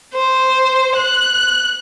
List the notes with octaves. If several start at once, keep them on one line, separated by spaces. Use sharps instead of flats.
C5
F#6